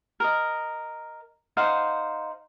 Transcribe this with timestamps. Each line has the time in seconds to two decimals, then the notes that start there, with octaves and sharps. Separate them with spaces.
0.20 A#4 D#5
1.57 D#4 C5 F5 F#5